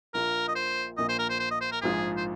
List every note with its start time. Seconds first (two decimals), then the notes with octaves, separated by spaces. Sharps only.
0.14 A#1 A#2 A#3 F4 A#4
0.48 D#5
0.56 C5
0.97 A#1 A#2 A#3 D#5
1.09 C5
1.19 A#4
1.29 C5
1.40 C5
1.51 D#5
1.61 C5
1.72 A#4
1.82 A#1 G#2 F3 G#4
2.17 C5